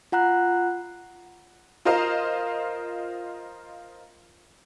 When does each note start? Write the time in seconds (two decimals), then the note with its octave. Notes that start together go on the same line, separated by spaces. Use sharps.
0.12 F4 F#5 A#5 F#6
1.85 F4 A#4 C5 D#5 F5